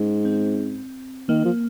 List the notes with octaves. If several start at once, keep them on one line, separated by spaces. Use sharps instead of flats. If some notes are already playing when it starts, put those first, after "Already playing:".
Already playing: G#2 C#4
C4
D#3 A#3
F3